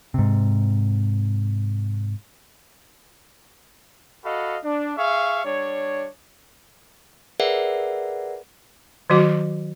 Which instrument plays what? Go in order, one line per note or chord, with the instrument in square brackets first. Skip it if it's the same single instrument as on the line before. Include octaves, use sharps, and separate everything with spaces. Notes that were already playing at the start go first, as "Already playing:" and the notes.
[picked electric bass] G#2 C3
[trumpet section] F#4 A4 D#5 F5 B5
D4
G#4 E5 F5 C#6
G3 D4 C#5
[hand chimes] G#4 A#4 B4 D5 E5 F#5
[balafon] D#3 F#3 F#4